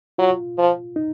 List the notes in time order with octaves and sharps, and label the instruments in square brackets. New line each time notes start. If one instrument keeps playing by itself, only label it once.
[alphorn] F#3 [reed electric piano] F4
[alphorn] F3
[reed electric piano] D#4